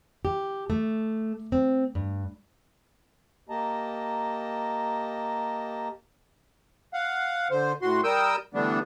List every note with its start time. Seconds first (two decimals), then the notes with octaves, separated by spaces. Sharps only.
0.25 G4
0.70 A3
1.52 C4
1.95 G2
3.49 A#3 G4 D#5 A5 A#5
6.94 F5 F#5
7.51 D3 C5
7.82 A2 F#4 C6
8.04 G3 A#4 G5 D#6 E6 G6
8.54 D3 E3 G3 A3 B3 D4